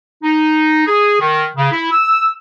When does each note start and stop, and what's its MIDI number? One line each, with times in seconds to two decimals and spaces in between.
0.23 0.85 63
0.87 1.18 68
1.20 1.45 51
1.56 1.71 49
1.72 1.89 64
1.91 2.30 88